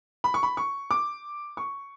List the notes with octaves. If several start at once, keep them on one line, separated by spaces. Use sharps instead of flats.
B5
C#6
B5
C#6
D6
C#6